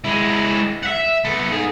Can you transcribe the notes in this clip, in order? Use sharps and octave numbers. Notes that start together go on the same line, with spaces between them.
G#3 E4
E5 F#5
B3 A4
G#2 G#4